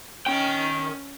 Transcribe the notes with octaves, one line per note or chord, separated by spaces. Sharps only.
D#3 C#4 G5